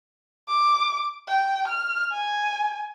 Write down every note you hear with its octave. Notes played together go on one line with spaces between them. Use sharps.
D6
G5
F6
G#5